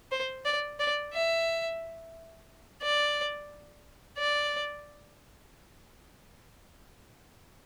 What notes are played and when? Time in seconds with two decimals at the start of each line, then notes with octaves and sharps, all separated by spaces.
0.12 C5
0.45 D5
0.80 D5
1.14 E5
2.82 D5
4.18 D5